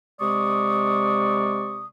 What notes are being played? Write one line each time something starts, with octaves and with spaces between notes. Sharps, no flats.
C3 G#3 D5 C#6 D#6